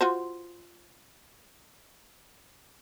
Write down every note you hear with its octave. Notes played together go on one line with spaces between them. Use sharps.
F4 F#4 C5